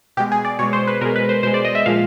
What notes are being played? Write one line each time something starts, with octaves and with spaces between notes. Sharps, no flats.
B2 G#3 G4
G#4
D5
B2 G#3 C#5
C5
B4
B2 G#3 A#4
B4
C5
B2 G#3 C5
D5
D#5
E5
A#2 F3 G#3 F5